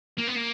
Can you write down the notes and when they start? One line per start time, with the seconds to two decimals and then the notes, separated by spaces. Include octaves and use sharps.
0.18 A#3
0.27 B3
0.36 A#3